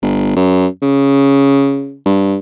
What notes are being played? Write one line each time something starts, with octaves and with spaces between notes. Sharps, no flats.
G1
F#2
C#3
G2